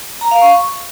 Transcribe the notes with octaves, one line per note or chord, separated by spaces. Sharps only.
A#5
F5
C#6